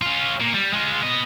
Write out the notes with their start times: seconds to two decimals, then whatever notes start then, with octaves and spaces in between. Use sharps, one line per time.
0.02 C#4 F4
0.41 A#2
0.54 G3
0.73 G#3 F4
1.03 B3 D#5